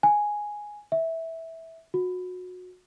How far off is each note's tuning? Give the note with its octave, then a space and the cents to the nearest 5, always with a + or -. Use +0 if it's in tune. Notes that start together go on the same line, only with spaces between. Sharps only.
G#5 +0
E5 -15
F#4 -25